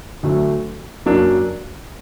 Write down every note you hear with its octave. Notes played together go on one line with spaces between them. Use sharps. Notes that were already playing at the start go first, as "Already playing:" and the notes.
D2 D3 F#3 A3
F#2 F#3 A#3 D4